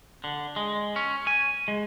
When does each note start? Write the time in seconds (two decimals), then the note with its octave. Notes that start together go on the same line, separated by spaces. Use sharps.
0.24 D3
0.56 G#3
0.96 C#4
1.27 G#5
1.68 G#3